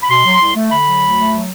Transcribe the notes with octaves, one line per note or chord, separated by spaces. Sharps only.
B5
B2 C6
F#3
C2
A3
D3 B5
F#3
D2
A3
F#3